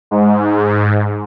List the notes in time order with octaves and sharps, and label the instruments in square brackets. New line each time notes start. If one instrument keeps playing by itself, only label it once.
[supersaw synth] G#2